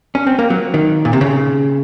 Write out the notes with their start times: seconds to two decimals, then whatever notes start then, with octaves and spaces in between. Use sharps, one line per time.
0.15 C#4
0.27 C4
0.39 A#3
0.50 F#3
0.74 D#3
1.05 A#2
1.13 C3
1.21 C#3